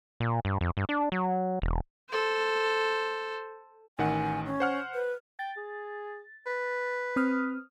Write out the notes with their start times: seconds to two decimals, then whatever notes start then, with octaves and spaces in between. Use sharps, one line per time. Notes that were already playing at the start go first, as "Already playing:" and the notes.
0.20 A#2
0.45 G2
0.61 F2
0.77 G2
0.89 D4
1.12 F#3
1.62 E1
2.09 A4 C5
3.98 A1 D#3 F#5 G#5
4.46 C#4
4.60 C5 F#5 F6
4.94 B4
5.39 G5 A6
5.57 G#4
6.46 B4
7.16 C4 D#6 F6